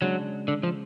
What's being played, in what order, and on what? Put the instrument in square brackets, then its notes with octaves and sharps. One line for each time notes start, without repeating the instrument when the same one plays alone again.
[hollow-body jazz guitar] C#3 G#3 D4 [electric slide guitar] F#3
[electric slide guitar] D3
F3